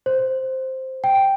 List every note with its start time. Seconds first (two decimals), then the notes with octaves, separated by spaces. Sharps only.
0.06 C5
1.04 G5